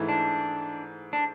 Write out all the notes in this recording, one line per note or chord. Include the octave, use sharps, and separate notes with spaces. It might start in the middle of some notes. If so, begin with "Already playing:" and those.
Already playing: G#2 E3 A3 E4
D4
D4